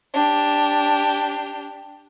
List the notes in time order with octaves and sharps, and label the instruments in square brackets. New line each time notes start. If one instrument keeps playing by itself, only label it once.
[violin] D4 G4